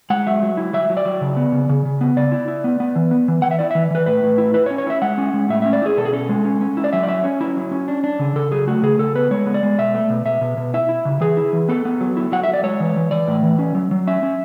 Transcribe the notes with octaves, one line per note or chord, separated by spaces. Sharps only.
G#3 F#5
F#3 E5
F#3
E4
F#3 E5
F#3
D5
F#3
C#3
B3
C#3
C#3
C#3
B3
C#3 D5
E4
E4
B3
B3
E3
B3
E3
E3 F#5
E5
E4 D5
E3 E5
E3 B4
A2 B4
A2
E4
E4 B4
C#5
C#4
C#5
E4 E5
G#3 F#5
C#4
G#3
A2 E5
C#4 E5
D5
E4 G#4
B2 A4
G#4
C#4 A4
G#3
C#4
C#4
E4
D5
F#3 E5
D5
C#4 E5
C#4 C#5
E4
F#3
C#4
D4
D4
C#3
C#3 A4
F#3 G#4
A3 F#4
C#3 G#4
C#3 A4
B3 B4
G#3 C#5
B3
D5
G#3
B2 E5
A3
B2
B2 E5
B2
B2
E4 E5
E4
C#3
E3 G#4
E4
E3
B3 A4
B3
F#3
E4
F#3 F#5
E5
F#3 D5
G#3 C#5
E3
E3
E3 D5
A2
E3
C#4
F#3
F#3
C#4 E5
C#4